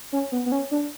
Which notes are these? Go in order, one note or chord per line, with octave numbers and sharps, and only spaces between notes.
C#4
B3
B3
C#4
D4